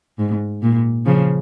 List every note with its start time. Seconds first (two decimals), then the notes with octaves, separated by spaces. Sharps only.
0.19 G#2
0.62 A#2
1.06 C#3 F3